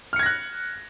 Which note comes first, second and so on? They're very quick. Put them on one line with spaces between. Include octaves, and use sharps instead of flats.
F6 C#7 G#6 A#6 F#6